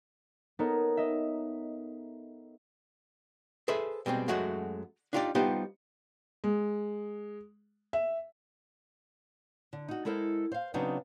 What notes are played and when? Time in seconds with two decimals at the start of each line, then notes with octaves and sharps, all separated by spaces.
0.59 B3 D#4 A4 A#4 C#5
0.97 D#5 E5
3.68 G#4 A4 B4 C5 E5
4.06 B2 G3 G#3 C4
4.28 F#2 F#3 G#3 A3 F#4
5.13 D4 D#4 F4 G4 C#5 D5
5.35 G3 B3 D#4 F4 G4 C5
6.44 G#3
7.93 E5
9.73 D3
9.88 D#4 F#4
10.05 G#3 E4 A4 A#4 C5
10.52 C5 F5
10.74 C#3 F#3 B3 C4 D4 D#4